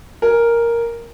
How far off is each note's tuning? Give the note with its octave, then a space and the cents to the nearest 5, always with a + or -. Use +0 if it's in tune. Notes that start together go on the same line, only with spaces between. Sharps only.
A#4 +0 G#5 +0